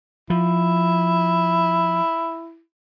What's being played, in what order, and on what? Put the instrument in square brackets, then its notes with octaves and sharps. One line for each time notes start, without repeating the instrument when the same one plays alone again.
[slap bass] F3 [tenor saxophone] E4